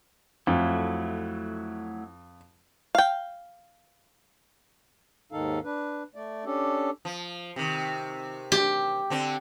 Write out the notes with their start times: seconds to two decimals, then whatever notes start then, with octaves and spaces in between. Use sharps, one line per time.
0.47 F2 F#3 A3 E4
2.95 F5 G5
5.32 D#2 G#2 D#3 D#4 A4 F5
5.64 D4 B4
6.15 A3 D5
6.45 C#4 D4 G4 A4
7.05 F3
7.56 C3 D#3
8.52 G4
9.10 D3 C4